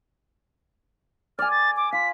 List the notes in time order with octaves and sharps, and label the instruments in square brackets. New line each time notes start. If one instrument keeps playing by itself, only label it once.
[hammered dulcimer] D5 G#5 [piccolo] F6
[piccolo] A6
D6
[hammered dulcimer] F4 [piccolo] B6